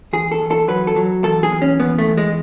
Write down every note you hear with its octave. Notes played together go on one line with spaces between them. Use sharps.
E2 G#4
A4
E2
A4
F#3 B4
A4
F#3
E2 A4
G#4
E2
C#4
E2 B3
A3
E2
G#3